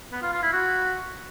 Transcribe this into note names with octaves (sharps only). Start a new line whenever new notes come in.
B3
F4
F4
E4
F#4